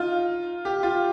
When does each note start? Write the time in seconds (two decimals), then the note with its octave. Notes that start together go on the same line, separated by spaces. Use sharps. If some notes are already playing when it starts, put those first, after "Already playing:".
Already playing: D#4 F4
0.65 G4
0.83 F4